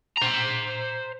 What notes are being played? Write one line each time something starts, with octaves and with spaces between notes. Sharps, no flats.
C5 A#5